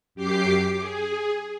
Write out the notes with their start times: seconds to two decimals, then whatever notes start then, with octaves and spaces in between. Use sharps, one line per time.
0.15 F#2 G4 D6 C7
0.79 G#4